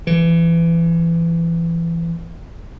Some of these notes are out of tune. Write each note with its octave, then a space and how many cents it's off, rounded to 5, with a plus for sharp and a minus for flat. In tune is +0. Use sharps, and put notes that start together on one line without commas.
E3 +25